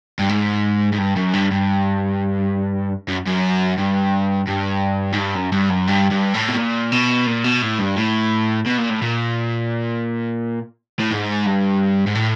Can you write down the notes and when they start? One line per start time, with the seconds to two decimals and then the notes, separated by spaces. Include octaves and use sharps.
0.19 G2
0.29 G#2
0.93 G#2
0.99 G2
1.17 F#2
1.34 G2
1.51 G2
3.08 F#2
3.26 F#2
3.78 G2
4.48 G2
5.13 G#2
5.18 G2
5.35 F#2
5.52 G2
5.70 F#2
5.87 G2
6.11 G2
6.34 A2
6.48 B2
6.57 A#2
6.92 B2
7.27 A#2
7.44 B2
7.62 A2
7.79 G2
7.96 A2
8.66 B2
8.78 A#2
8.90 A2
9.02 A#2
10.99 A2
11.11 G#2
11.46 G2
12.07 G#2
12.15 A2